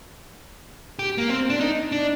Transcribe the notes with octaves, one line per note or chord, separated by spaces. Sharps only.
G4
A#3
C4
D4
D#4
D4